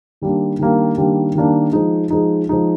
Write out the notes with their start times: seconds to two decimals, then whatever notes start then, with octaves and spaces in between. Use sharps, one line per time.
0.22 D#3 G3 A#3 D4
0.59 D#3 G3 A#3 D4
0.97 D#3 G3 A#3 D4
1.35 D#3 G3 A#3 D4
1.73 F3 G#3 D#4
2.10 F3 G#3 D#4
2.49 F3 G#3 D#4